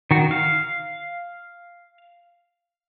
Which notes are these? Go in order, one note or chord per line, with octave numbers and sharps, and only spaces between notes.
D#3 F#4
F5